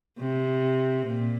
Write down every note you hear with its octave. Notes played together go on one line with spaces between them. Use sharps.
C3
A#2